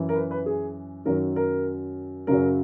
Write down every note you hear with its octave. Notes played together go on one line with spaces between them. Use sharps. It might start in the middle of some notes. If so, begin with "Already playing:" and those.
Already playing: F#2 E3
A#4
B4
B4
G#4
F#2 D#3 F#3 A#4
A#4
F#2 C#3 F#3 A#4